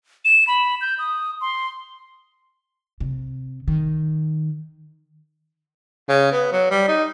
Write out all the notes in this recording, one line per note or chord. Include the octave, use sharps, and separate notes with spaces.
E7
B5
G6
D#6
C6
C3
D#3
C#3
B3
F#3
G3
D#4